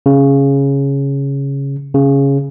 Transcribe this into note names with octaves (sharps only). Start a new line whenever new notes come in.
C#3
C#3